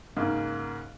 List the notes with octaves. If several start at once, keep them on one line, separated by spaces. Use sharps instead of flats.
G#2 C#3 A#3 D#4